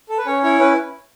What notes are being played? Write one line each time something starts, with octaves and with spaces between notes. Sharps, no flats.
A4
B4
C#4 C#5
E4 C#5
C#4 B4